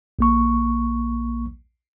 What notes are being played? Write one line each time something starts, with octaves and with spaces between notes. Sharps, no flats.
A#1 A#3 C#6